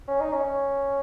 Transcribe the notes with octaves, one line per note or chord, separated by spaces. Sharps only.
C#4
D#4
C#4
C#4